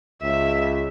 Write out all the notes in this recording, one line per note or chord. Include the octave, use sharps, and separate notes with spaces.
C#2 E5